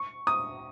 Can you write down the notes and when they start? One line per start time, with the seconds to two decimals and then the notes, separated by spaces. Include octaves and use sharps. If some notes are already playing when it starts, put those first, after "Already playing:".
Already playing: C#6
0.27 D#6